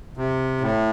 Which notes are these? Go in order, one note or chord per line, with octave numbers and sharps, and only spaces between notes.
C3
A2